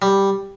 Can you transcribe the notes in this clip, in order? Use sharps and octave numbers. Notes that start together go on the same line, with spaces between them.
G3